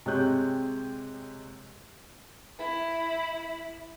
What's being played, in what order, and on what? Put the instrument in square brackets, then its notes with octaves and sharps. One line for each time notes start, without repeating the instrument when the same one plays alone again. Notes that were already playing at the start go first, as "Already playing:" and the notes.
[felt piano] C3 G#3 G4 C#5 F#6 G6
[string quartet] E4